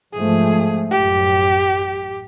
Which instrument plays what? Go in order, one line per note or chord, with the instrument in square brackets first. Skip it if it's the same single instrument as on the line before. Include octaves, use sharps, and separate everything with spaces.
[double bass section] G#2 F3 A3 [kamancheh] G#4
[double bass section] A1 F#2 [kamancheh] G4